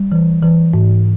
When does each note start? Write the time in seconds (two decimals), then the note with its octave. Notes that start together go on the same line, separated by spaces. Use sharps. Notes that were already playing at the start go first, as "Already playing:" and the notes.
Already playing: G3
0.12 E3
0.43 E3
0.74 G#2